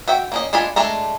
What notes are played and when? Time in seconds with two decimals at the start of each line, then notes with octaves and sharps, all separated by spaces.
0.08 F#4 E5 G5
0.32 A#3 C#4 D#5
0.53 G#3 D4 F4 G#5 B5
0.76 G#3 A3 D4 A#5